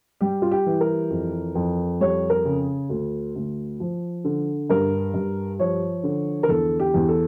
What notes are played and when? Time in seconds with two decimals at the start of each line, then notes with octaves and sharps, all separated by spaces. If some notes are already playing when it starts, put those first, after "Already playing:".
0.21 G3 G4
0.42 F4
0.52 G4
0.66 E3
0.81 A#4
1.10 F2
1.55 F2
2.01 G3 C#5
2.30 A#4
2.45 C#3
2.90 D2
3.36 D2
3.80 F3
4.25 D3
4.70 G2 A#4
5.14 G2
5.59 F3 C#5
6.04 D3
6.43 A#4
6.48 E2 A4
6.80 G4
6.94 E2
7.09 A4